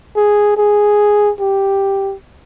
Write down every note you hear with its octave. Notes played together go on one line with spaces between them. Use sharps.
G#4
G#4
G4